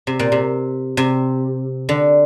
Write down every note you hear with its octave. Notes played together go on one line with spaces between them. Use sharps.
C3
A#2
C3
C3
D3